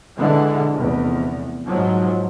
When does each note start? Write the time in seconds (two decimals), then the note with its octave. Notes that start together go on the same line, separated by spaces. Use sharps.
0.16 D3 E3 G#3
0.74 F1 E2
1.67 G#2 F3 F#3